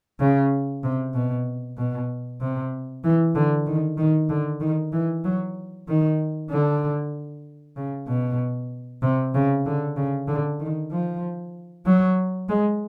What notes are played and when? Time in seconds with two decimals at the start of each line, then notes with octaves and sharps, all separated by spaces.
0.20 C#3
0.83 C3
1.14 B2
1.77 B2
2.41 C3
3.04 E3
3.35 D3
3.67 D#3
3.97 D#3
4.29 D3
4.61 D#3
4.93 E3
5.24 F#3
5.88 D#3
6.50 D3
7.77 C#3
8.07 B2
9.03 C3
9.34 C#3
9.66 D3
9.96 C#3
10.28 D3
10.60 D#3
10.92 F3
11.86 F#3
12.49 G#3